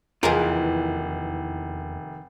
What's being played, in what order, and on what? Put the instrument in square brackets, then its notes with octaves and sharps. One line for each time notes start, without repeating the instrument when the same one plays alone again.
[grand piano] F1 [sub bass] E2 [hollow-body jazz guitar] D#3 A#3 F4 [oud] E3 G#4 A#4